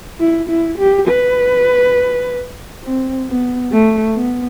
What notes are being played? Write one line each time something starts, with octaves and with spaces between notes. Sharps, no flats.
E4
E4
G4
B4
C4
B3
A3
B3